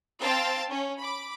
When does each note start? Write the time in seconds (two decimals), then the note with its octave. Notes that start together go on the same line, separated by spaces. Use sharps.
0.19 C4 F5 G5 A5 A6
0.69 C#4
0.99 B5 D6